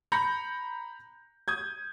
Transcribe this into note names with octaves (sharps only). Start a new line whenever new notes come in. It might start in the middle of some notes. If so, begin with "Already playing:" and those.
A#5 B5 G6 A#6 C#7
D#6 G6 G#6